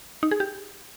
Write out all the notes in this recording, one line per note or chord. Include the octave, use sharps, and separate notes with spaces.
D#4
G#4
G4